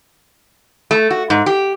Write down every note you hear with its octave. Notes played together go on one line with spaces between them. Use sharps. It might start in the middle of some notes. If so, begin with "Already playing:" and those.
A3
F#4
G#2
G4